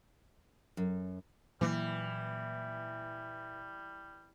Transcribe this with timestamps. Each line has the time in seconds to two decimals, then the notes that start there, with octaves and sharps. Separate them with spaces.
0.77 F#2
1.61 A#2 E3 F#3 G3 A#3